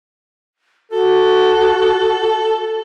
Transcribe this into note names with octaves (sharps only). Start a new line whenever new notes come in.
F#4 A4